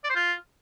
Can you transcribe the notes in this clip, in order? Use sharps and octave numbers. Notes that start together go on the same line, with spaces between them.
D5
C5
F4